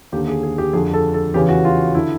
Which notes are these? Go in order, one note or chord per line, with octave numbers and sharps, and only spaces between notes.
D#2 D3 G4
G#4
G#4
G4
F2 D3 G#4
A4
A4
E2 C#3 E3 G4
F#4
F4
D3 E4